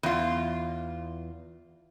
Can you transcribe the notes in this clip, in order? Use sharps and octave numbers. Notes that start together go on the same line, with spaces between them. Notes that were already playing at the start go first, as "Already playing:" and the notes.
E2 F4